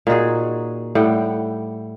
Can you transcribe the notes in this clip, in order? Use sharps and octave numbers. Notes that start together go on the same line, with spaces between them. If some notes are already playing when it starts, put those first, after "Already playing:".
A#2 D#4 F#4 G#4
A2 G3 F#5 G5